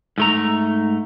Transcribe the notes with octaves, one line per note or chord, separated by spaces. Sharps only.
G#2 A3 A#5